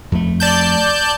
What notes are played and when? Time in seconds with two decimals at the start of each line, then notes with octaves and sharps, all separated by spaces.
0.12 F2 A3
0.40 D5 A5 G6